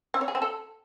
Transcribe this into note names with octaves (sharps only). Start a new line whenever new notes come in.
C4
C#5
G#4
C4
A4